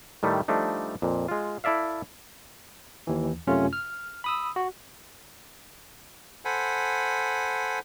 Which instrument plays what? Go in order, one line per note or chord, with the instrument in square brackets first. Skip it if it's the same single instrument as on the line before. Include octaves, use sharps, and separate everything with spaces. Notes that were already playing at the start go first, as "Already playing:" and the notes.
[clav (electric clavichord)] A2 D#3 G3 A3
F3 G3 A3 D4 D#4
F2 A#2
G#3 F4
E4 A4 D5 E5 F5
[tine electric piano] D#2 E3
F#2 C3 A3 C#4 F4
F6
B5 D#6 E6
F#4
[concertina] A4 C5 F#5 G#5 B5